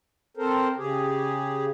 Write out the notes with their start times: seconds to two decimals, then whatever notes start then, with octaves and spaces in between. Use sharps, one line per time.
0.37 C4 A4 A#4 C5
0.77 C#3 G4 G#4